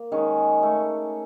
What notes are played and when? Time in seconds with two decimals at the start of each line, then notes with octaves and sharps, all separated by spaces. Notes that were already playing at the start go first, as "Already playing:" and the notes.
Already playing: A#3
0.12 D#3 G#3 C#4
0.63 A3